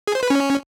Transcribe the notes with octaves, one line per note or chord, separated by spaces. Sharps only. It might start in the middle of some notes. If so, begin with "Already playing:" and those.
G#4
C5
B4
C#4